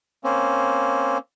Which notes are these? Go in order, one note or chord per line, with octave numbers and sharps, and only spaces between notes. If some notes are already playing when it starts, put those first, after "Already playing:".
A#3 C4 C#4